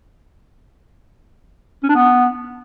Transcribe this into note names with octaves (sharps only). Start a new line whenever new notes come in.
C#4
D4
B3